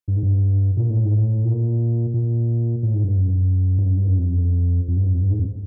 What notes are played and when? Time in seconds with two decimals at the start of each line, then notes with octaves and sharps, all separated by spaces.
0.08 G2
0.16 G#2
0.23 G2
0.77 A#2
0.90 A2
1.05 G#2
1.18 A2
1.45 A#2
2.14 A#2
2.83 A2
2.94 G#2
3.04 G2
3.17 F#2
3.78 G2
3.85 F#2
3.97 G2
4.07 F#2
4.19 F2
4.88 F2
4.97 G2
5.05 F#2
5.14 F2
5.22 G2
5.31 G#2
5.39 F2